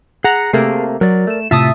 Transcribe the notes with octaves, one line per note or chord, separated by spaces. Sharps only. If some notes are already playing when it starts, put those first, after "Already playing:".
G#4 F#5 A#5
C3 A3 A#3 G#4 A#4
F#3 A#4 D5
A3 E7
A2 C3 F4 E5 A5 D#6